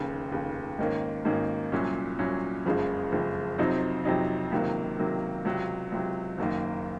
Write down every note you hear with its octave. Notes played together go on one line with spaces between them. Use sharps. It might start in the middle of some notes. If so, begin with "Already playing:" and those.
Already playing: F1 D#2 C#3
F1 D#2 C#3
G#1 G#2 D#3 A#3 C#4
G#1 G#2 D#3 A#3 C#4
C2 A#2 F#3 C#4
C2 A#2 F#3 C#4
F#1 F2 C#3 F3 G#3
F#1 F2 C#3 F3 G#3
F2 C3 F#3 C4 D#4
F2 C3 F#3 C4 D#4
C#2 C3 D#3 F#3 A#3
C#2 C3 D#3 F#3 A#3
C#2 C3 F#3
C#2 C3 F#3
F#1 F#2 D#3 A#3